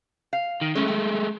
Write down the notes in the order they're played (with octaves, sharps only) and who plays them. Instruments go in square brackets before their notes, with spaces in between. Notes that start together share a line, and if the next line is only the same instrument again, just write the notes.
[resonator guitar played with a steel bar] F5
[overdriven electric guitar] D#3
[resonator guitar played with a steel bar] E3 C#4 [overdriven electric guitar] G#3 A3
[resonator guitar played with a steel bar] G5